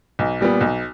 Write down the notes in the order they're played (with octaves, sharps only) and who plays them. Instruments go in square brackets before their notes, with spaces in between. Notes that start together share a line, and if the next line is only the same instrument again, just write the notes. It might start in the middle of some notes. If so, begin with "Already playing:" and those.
[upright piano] B1
A#2 G3 B3
B1